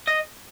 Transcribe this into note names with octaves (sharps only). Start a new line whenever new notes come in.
D#5